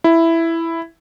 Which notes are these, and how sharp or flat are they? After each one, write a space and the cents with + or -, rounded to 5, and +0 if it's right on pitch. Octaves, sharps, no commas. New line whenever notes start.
E4 +5